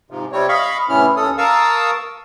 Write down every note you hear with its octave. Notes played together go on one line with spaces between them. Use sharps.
G#2 C3 F3
C3 G3 C4 C#5
D#5 F5 B5 C#6
A2 C3 B3 C#4 E4 F6
D#2 C#4 A4 D#6
A#4 F5 A5 C#6 D#6 E6